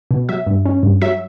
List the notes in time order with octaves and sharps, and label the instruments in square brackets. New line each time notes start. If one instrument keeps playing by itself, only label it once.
[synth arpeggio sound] B2
F#3 E5
G2
C#4
G2
F#3 E5